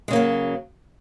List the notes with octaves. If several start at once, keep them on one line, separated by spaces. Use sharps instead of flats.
C#3 F#3 G#3 A#3